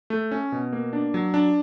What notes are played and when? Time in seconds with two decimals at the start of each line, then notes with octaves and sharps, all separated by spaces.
0.10 A3
0.31 C#4
0.52 B2
0.73 A#3
0.93 D4
1.14 F#3
1.34 D4